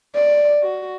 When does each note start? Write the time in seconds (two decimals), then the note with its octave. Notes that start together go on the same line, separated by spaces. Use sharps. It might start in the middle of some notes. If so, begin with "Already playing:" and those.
0.15 D5
0.63 F#4